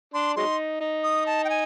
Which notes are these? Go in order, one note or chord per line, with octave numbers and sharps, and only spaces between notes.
D4 C6
F#3 G#3 D#4 C6
D#4
D#6
A5
G5
G#5